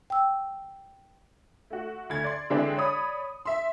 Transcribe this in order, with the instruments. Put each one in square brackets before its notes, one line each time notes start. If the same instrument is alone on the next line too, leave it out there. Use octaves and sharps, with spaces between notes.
[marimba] G5 E6
[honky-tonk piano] A3 F#4
D2 D3 G#6
D5 C6
D3 E3 G#3 C4 D4 G4
C#5 D5 B5 D#6
E5 C6